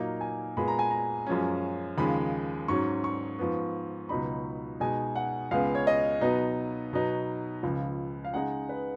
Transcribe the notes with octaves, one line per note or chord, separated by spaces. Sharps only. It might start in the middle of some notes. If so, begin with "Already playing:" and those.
Already playing: A#2 F#3 A#3 D#4 F5
G#5
A#2 G#3 B3 B5
A#5
G#5
A#5
F#2 F3 G#3 C#4
D#2 C#3 F3 G#3 B5
G#2 F#3 C#4 C#6
C#6
G#2 F3 B3
C#2 B2 F#3 B3 D#4 B5
B2 G#3 D#4 G#5
F#5
C#2 C#3 G#3 B3 F5
C#5
D#5
B2 F#3 B3 D#4
B2 F#3 B3 D#4
C#2 C#3 F3
F5
C#3 G#3 D#4 F#5
B4